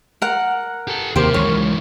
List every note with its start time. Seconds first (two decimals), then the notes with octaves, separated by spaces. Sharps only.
0.22 A#4 F#5
0.88 G4 A4
1.16 D#2 C3 G4 A#4 C5
1.34 C#2 C#3 E3 F#3 C#5